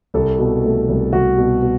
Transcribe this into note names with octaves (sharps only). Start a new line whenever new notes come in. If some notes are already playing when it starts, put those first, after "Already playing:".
C2 A4
B2
A3
C2
C2 F#4
B2
B2